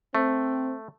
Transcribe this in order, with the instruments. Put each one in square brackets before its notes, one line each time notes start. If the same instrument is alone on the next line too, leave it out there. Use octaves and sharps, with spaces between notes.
[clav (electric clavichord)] A3 [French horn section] C4